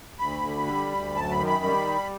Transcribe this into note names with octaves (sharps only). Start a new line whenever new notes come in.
D2 B5
D3
G3
D2
F#2 A5
B5
D#3
B5
G3